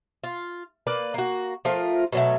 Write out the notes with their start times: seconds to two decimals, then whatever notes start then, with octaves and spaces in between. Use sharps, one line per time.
0.24 F4
0.87 A#3 B4 D5
1.14 A#3 F#4
1.65 F3 A3 F4 A#4
2.13 B2 F#3 A3